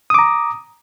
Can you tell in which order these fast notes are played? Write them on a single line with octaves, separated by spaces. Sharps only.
D#6 D6 A#5